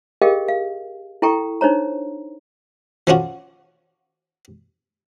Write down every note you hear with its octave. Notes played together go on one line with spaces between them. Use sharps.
G4 G#4 A#4 D#5 F5 G5
F5
E4 A4 G5 A#5 C#6
D4 D#4 C5 C#5 A#5
F3 A3 C#4 D4 F4 F#4